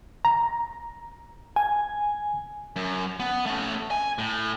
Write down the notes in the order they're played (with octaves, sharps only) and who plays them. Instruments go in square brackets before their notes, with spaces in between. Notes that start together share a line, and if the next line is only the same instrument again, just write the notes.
[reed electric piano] A#5
[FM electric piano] G#5
[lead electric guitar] F#2
B3
A3 C#4
G#5
A2